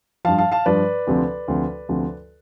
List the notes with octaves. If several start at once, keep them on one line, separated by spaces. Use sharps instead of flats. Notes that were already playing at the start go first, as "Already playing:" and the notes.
G2 F3 F5 A5
F5 A5
F5 A5
G2 F3 B4 D5
D2 C3 F3
D2 C3 F3
D2 C3 F3